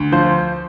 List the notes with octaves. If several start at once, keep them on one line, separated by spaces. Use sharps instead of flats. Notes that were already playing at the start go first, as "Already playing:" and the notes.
Already playing: D2
F3 C5